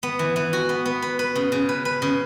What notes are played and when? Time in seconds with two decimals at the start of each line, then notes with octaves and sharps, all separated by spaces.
0.03 B3
0.19 E3
0.36 E3
0.53 F#4
0.69 B3
0.85 B3
1.02 B4
1.19 B4
1.35 C#3
1.52 C#3
1.69 B4
1.85 B4
2.02 C#3